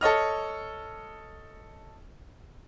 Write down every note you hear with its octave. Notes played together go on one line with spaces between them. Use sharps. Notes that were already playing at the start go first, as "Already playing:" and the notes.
A4 C#5 D#5 F6